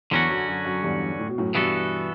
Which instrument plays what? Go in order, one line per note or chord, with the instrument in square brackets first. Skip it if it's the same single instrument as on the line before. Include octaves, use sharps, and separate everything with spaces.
[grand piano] E2 [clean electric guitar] D3 F#3 C#4 F#4
[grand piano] F#2
F#2
F#2
E2 G2
A2
B2
F#2 A2
[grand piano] G2 B2 [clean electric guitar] E3 B3 F#4 A4